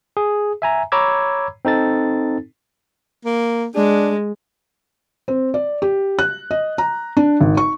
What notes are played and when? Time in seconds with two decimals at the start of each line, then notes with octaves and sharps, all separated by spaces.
0.17 G#4
0.62 E5 G#5 A#5
0.92 C#5 A#5 B5 D6 E6 G#6
1.65 C4 D#4 A4 A6
3.25 A#3
3.75 G#3 D4
5.28 C4
5.54 D5
5.82 G4
6.19 F#6
6.51 D#5
6.78 A#5
7.17 D4
7.41 G#1
7.57 C#6